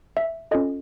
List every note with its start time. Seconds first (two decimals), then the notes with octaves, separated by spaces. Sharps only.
0.17 E5
0.51 C#4 F4 A4 D#5